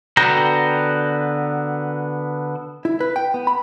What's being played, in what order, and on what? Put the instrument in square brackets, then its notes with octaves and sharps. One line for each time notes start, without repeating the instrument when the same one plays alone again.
[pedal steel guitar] D3 B3 F#4 G5 A#5
[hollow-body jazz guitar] E4
B4
G5
B3
B5